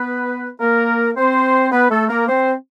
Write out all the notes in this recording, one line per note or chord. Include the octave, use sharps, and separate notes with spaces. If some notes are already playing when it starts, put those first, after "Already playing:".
Already playing: B3 B4
A#3 A#4
C4 C5
B3 B4
A3 A4
A#3 A#4
C4 C5